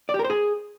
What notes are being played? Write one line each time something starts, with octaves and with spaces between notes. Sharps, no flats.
D5
G4
A#4
C5
G#4